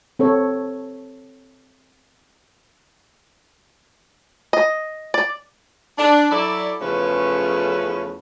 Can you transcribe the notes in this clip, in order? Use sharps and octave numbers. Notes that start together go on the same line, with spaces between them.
C4 A4 C#5
D#5
D5
D4
F#3 E4 A4 D5
E2 C#3 F3 A3 C#4 B4